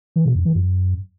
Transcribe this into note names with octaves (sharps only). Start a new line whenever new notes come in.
E3
B2
F2
E3
F#2